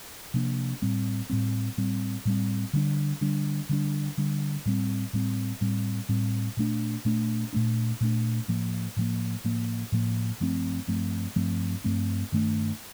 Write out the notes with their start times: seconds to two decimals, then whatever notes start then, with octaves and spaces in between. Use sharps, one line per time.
0.34 C3 F3 A#3 D4
0.82 A2 G3 C4
1.30 A2 G3 C4
1.77 A2 G3 C4
2.25 A2 G3 C4
2.73 D3 G3 D4
3.21 D3 G3 D4
3.69 D3 G3 D4
4.18 D3 G3 D4
4.66 A2 G3 C4
5.13 A2 G3 C4
5.61 A2 G3 C4
6.09 A2 G3 C4
6.57 A#2 A3 D4
7.05 A#2 A3 D4
7.53 A#2 A3 D4
8.01 A#2 A3 D4
8.48 A2 F3 A#3
8.97 A2 F3 A#3
9.44 A2 F3 A#3
9.92 A2 F3 A#3
10.40 G2 F3 A3 C4
10.88 G2 F3 A3 C4
11.36 G2 F3 A3 C4
11.84 G2 F3 A3 C4
12.32 G2 D#3 A3 D4